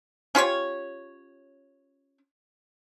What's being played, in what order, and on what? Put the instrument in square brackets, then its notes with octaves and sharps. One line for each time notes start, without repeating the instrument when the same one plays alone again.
[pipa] C#4 F4 G4 C#5